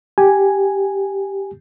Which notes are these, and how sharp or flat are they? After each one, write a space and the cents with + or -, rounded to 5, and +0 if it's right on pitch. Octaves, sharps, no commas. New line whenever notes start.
G4 +0 G#5 +0